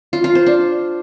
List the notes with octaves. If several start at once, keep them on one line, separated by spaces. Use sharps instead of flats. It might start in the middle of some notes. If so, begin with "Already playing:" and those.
F4
F4
C5
D4